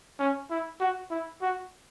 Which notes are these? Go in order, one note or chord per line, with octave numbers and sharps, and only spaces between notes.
C#4
E4
F#4
E4
F#4